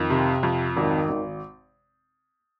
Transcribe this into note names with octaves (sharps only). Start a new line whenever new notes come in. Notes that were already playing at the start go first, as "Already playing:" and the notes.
Already playing: F2 D#3
C3
F2
G#1 D#3
G#1